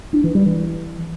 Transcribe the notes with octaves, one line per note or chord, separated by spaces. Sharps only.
D4
E3
G3
E3